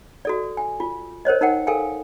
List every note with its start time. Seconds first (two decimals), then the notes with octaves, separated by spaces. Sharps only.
0.25 F#4 A4 D5
0.57 G#5
0.80 F4
1.25 A#4 C5 C#5 D#5
1.41 D#4 A#4 F#5 G5
1.67 A4 A#4 F5 G5 G#5